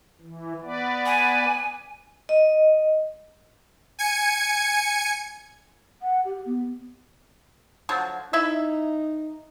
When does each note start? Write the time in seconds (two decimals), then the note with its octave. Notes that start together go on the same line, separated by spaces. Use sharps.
0.22 E3
0.63 B3 B4 D5
1.06 G#5
2.29 D#5
3.99 G#5 G#6 C#7
6.02 F#5
6.25 G4
6.46 B3
7.89 D3 F3 F#3
8.33 D#4 E4 E5